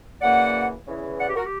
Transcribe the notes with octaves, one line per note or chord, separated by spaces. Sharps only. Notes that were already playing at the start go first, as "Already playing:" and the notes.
F#2 C#3 E3 A#3 D5 F#5
E2 C#3 E3
D5 F#5
G4
F#4 A#4
G4